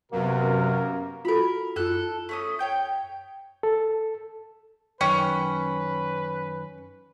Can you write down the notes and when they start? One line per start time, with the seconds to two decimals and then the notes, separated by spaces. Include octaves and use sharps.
0.12 F#2 C3 A#3 B3 F#4 A#4
1.25 F4 F#4 A4 A#4 B5
1.76 F#2 F4 A4 F#6
2.29 A3 C#4 D#6
2.59 C#5 G5 G6
3.63 A4
5.01 F#2 D#3 C#4 B4 G5